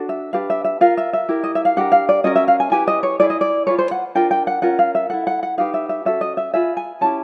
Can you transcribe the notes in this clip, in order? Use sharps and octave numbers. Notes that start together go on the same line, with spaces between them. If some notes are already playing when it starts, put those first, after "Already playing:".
Already playing: D4 F#4 A4
E5
D4 G4 B4 F5
E5
E5
F4 A#4 F5
E5
E5
E4 G4 A#4
D#5
E5
F5
D4 G4 A#4 F#5
F5
D5
C#4 F#4 A#4 D#5
E5
F5
G#5
E4 G4 B4 G#5
D#5
C#5
E4 G#4 B4 D5
D#5
D5
F4 G#4 B4 C#5
C5
F#5
D4 F4 A#4 G5
G5
F#5
C#4 F4 A#4 F#5
F5
E5
E4 A4 F#5
F#5
F#5
D#4 G4 B4 F5
E5
E5
C#4 F#4 A4 E5
D#5
E5
F4 G#4 B4 E5
G#5
C#4 E4 G4 A5